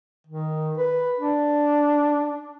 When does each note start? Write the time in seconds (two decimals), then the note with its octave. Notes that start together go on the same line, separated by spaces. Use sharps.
0.27 D#3
0.78 B4
1.18 D4